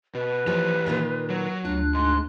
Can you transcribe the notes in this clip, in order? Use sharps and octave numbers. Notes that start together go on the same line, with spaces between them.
B2 B4
E3 F3 G4
A#2 D#3 F4
F#3
D2 D4 F4 F#6
G#2 C6